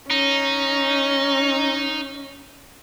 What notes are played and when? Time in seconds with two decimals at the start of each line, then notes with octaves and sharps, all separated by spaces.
0.11 C#4 D#4